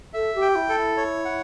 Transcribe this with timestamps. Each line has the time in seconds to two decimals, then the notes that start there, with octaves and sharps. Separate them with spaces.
0.14 A4 E5
0.35 G4
0.42 G5
0.55 E4
0.69 A4
0.76 E4
0.97 C#5
1.25 F#5